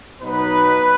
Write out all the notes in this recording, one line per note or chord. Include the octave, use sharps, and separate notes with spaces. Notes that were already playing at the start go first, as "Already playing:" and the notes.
B2 F#3 B3 D#4 B4